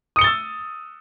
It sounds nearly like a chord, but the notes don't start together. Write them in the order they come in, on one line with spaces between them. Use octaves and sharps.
D#6 C#7 G7 A6 E6